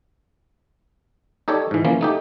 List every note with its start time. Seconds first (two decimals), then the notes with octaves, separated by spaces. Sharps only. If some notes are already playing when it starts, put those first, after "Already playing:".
1.48 D#4 G4 A4 C#5 D5
1.71 G#2 E3
1.85 E3 F3 A#3 C#4
2.01 A3 D#4 G4